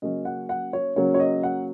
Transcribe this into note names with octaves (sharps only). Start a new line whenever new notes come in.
C#3 F#3 A#3 C#4 D#5
F#5
F#5
C#5
C#3 F#3 A#3 C#4 C#5
C#5
D#5
F#5